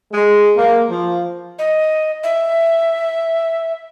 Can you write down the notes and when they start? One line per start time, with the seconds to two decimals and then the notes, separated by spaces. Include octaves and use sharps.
0.12 G#3
0.56 A#3
0.89 F3
1.59 D#5
2.23 E5